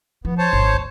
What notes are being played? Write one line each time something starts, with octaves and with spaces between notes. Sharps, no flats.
F3 B3
C5 C#5 A5
G#1
D2